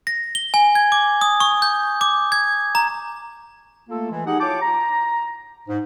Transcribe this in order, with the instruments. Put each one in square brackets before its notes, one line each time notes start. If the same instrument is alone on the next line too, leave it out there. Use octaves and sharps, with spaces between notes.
[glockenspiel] A#6
G7
G#5
G#6
D6
D#6
C#6
G6
D6
G#6
A#5
[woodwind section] A3 A#3 F4 A4
E3 G#3
D#4 G4 G#4 F#5
E4 F4 C#5 G5 A5 D6
A#5
G#2